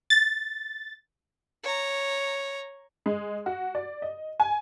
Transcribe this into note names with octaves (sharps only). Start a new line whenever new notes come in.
A6
C#5 A#5
G#3
F#4
D5
D#5
G#5